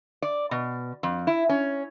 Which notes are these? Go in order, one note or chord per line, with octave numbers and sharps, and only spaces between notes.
D5
B2
F2
E4
C#4